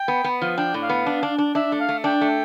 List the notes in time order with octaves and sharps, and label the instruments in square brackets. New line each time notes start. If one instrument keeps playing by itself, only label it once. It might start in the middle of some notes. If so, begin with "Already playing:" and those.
Already playing: [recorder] G5
[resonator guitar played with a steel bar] B3
B3
F3
[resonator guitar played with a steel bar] D4 [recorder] G5
[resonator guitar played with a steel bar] A2
[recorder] F5
[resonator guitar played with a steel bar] B3
D4
D4
D4
[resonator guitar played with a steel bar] D4 [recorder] E5
[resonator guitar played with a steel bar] A3
[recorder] F5
[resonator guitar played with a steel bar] A3
[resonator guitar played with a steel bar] D4 [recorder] G5
[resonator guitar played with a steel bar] A3